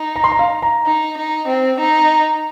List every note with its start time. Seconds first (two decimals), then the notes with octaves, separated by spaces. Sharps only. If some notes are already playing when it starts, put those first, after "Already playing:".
Already playing: D#4
0.16 A#5
0.24 C6
0.32 A#5
0.39 F5
0.62 A#5
0.86 D#4
1.18 D#4
1.48 C4
1.80 D#4